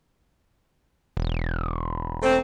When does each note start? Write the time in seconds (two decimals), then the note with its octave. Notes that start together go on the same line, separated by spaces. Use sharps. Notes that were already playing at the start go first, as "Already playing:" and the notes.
1.17 E1
2.23 A3 C4